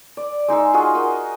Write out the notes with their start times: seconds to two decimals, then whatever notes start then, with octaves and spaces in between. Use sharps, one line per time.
0.17 D5
0.48 G#3 D#4 G#4 E6
0.74 F4 F#4 G#4 D#5
0.95 F#4 A#4 D#5